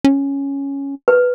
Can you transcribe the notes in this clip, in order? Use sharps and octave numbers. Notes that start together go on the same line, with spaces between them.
C#4
B4